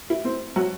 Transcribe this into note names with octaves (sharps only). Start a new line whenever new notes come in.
E4
C4
F#3